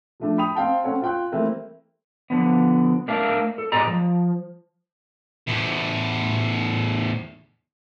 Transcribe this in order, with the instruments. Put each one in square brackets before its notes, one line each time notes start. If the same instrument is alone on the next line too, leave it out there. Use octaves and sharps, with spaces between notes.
[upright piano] F3 A3 D4
G5 B5 D#6 F7
C4 F5 G5 A5
C4 C#4 A4 C#5 F#5
F4 G5 F#6
E3 G3 A3 A#3 C4
[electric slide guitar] D3 F3 B3
A3 D4 A#4 E5 F5
A4
G#2 G#3 G4 D5 A#5
F3
[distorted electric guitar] E2 A2